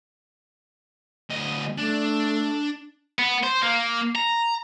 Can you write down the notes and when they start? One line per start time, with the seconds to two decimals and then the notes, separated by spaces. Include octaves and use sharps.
1.30 D2 D#5
1.79 A3 D4
3.19 B3
3.44 C5
3.63 A#3
4.15 A#5